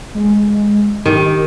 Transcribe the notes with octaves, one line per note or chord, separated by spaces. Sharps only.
G#3
D#3 G4